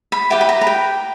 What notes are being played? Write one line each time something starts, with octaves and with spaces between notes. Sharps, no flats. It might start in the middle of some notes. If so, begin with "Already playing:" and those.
B5
E4 G4 B4 G5
B5
A#5
A#5
G5